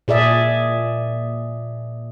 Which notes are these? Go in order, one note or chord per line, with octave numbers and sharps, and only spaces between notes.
A#2 G#4 D5 E5